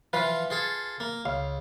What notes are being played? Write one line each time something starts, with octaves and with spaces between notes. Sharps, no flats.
E3 F3 F4 B4 F5
F4 G#4 A4
A#3
C#2 F5